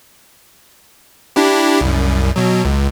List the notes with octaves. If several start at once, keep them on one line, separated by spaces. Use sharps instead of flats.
D4 E4 G4
C2 F#2
B2 F#3
C#2